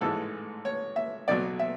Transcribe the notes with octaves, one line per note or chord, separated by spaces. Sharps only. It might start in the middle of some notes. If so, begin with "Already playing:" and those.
A1 G#2 E3 G#3 A4
C#5
E5
B1 B2 F#3 D5
E5